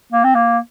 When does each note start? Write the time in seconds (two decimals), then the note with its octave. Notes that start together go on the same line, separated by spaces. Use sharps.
0.12 A#3
0.24 C4
0.35 A#3